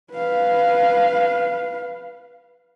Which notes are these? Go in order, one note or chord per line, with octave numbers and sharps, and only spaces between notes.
B4 F5